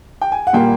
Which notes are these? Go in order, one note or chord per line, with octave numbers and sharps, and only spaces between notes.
G5
G#5
F#5
A#2 G3 A#3 G5